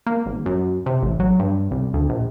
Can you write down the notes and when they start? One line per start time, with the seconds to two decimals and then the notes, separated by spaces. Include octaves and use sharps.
0.06 A#3
0.26 G#1
0.46 F#2
0.86 C3
1.03 A1
1.20 F#3
1.39 G2
1.71 C2
1.94 D2
2.09 A#1